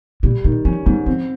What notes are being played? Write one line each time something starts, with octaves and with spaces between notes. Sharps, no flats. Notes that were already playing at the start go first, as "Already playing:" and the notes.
A#2 G3
A#2 D#3
F3 C#4
G#2 G3
F3 C4